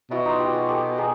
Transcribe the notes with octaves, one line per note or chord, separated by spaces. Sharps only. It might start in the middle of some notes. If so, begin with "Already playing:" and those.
B2 E4 F#4
D#4 F4
F4 G4
F#4 G#4
G4 A4
G#4 A#4